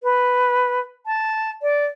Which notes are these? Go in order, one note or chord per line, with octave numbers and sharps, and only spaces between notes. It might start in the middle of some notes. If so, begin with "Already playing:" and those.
B4
A5
D5